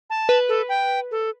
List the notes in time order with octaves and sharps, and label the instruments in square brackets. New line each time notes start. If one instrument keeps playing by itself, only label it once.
[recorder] A5
[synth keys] B4
[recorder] A4
G5
A4